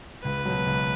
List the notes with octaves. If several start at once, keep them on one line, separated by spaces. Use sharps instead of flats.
C#2 B4
B2 F#3
C#2